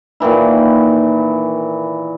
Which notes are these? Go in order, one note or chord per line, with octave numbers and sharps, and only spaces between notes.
A#2 D#3 E3 E4